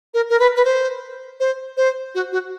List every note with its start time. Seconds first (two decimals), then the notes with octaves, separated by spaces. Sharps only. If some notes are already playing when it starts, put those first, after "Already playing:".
0.14 A#4
0.30 A#4
0.40 B4
0.56 B4
0.65 C5
1.40 C5
1.77 C5
2.15 F#4
2.32 F#4